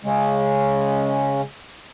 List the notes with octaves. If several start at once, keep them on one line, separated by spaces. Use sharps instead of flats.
C#3 G#3 C#4